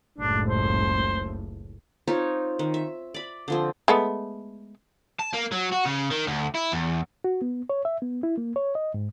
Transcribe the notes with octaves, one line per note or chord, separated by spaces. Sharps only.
F#1 C#2 A2 D4
C5
C4 D#4 F4 C#5
D#3
E5
D5 B5
D3 F3 C4
G#3 A3 B3
A5
A#3
F#3
F#4
C#3
D#3
D2
E4
E2
F#4
B3
C#5
E5
B3
E4
A#3
C#5
D#5
G#2